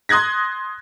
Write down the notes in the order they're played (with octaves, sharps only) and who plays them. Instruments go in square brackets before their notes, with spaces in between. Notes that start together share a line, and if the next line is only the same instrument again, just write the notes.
[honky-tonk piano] C6 D#6 F#6 G#6 A#6